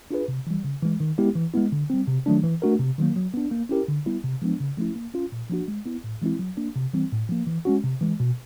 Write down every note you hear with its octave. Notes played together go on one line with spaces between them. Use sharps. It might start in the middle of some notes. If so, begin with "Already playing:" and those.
D4 F4 G#4 B4
C3
E3 G3
C#3
E3 G#3
D#3
G#3 B3 E4 G4
E3
G#3 B3 E4
D3
G3 C4
C3
D#3 F#3 A3 D4
E3
A3 D4 F#4 A#4
C3
D#3 F#3 A#3
F#3
B3 D4
A#3
C#4 E4 G4 A#4
D3
G3 B3 E4
C3
F3 G#3 B3 D4
C#3
F3 A3 C#4 E4
A#3
C#4 F4
A#2
F3 A#3 D4 F#4
G#3
B3 E4
A2
E3 G#3 C4 E4
F#3
A#3 D4
C3
E3 G3 C4
A2
F3 A#3
E3
G#3 C#4 F#4
C3
E3 G#3
B2